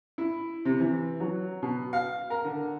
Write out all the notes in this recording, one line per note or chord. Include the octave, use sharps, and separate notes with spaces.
E4
C3
E3
F#3
B2
F5
A#4
D3